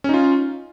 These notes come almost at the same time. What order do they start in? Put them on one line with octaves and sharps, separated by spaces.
C#4 D#4 F4